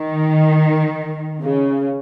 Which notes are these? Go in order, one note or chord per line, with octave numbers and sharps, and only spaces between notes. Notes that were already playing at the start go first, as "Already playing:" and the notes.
Already playing: D#3
C#3